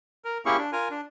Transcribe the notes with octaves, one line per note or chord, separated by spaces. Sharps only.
A#4
A#3 C#4 E4 G4 G#4 C#6
D4
F4 A#4 G#5
D4